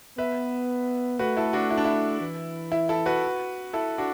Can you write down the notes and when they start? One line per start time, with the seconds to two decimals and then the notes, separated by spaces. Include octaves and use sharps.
0.18 B3 B4 E5
1.19 A3 F#4 B4
1.37 E4 A4
1.53 D4 F#4
1.70 E4
1.77 D4
1.85 E4
2.21 E3
2.72 E4
2.89 E4 A4
3.06 F#4 B4
3.73 E4 A4
3.98 D4 F#4